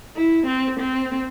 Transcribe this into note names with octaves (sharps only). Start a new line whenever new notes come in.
E4
C4
C4